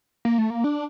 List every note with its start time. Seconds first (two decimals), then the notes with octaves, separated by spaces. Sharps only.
0.25 A#3
0.38 A3
0.50 A#3
0.64 D4